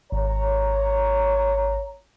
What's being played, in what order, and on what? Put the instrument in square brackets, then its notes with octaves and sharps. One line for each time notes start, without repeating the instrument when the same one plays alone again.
[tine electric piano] G#1 [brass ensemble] C#5 A#5